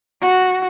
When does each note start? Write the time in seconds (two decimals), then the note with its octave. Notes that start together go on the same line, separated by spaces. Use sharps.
0.21 F#4